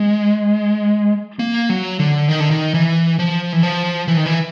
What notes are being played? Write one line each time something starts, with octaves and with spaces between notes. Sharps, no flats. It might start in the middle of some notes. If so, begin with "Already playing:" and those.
Already playing: G#3
A#3
F#3
D3
D#3
D3
D#3
E3
F3
E3
F3
E3
D#3
E3